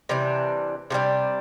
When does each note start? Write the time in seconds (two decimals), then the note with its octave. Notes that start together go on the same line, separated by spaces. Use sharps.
0.09 C3 E3 G3 D4
0.90 C3 E3 G3 D4